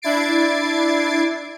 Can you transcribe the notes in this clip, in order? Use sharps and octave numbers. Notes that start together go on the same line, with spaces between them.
D4 E4 G#6 A6 C7 D7